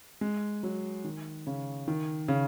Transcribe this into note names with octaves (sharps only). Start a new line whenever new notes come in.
G#3
F#3
D#3
C#3
D#3
C#3